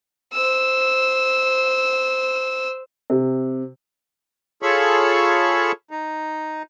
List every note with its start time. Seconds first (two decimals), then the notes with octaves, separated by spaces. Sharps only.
0.33 C5 E6
3.10 C3
4.62 F4 G#4 A4 C#5 B5 C#6
5.91 D#4